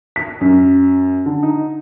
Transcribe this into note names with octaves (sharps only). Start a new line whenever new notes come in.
B6
F#2
D3
D#4